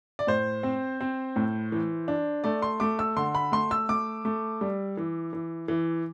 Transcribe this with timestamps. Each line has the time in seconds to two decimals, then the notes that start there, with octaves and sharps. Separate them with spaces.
0.19 D5
0.27 A2 C5
0.63 C4
1.01 C4
1.36 A2
1.72 E3
2.08 D4
2.44 A3 D5
2.62 C6
2.80 A3 D6
2.99 E6
3.17 D3 C6
3.35 B5
3.52 A3 C6
3.71 E6
3.89 A3 D6
4.25 A3
4.61 G3
4.97 E3
5.33 E3
5.68 E3